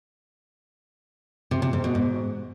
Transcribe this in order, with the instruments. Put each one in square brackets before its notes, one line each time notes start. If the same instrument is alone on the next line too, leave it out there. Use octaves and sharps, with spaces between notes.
[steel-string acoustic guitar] C3
C3
G#2
B2
G#2